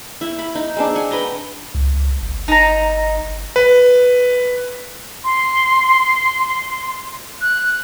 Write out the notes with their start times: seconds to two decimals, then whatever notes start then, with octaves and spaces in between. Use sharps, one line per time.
0.21 E4
0.38 B5
0.55 D#4
0.77 G#3 C4 D4
0.95 F#5 G#5
1.11 B4 G5 A#5
1.75 C#2
2.23 G1
2.48 D#4 A#5
3.56 B4
5.24 C6
7.41 F#6